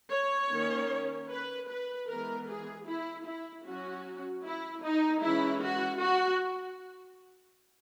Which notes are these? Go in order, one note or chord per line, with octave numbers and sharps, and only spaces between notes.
C#5
D#3 A#3 C#4
B4
B4
E3 G#3 B3 A#4
G#4
E4
E4
F#3 C#4 F#4
E4
D#4
E3 G#3 C#4 E4
F#4
F#4